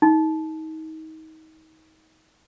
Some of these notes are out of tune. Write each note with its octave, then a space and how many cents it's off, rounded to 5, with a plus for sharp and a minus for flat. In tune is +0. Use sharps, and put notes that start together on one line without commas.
D#4 +30